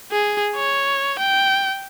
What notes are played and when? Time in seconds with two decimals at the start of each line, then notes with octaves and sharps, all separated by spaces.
0.12 G#4
0.56 C#5
1.19 G5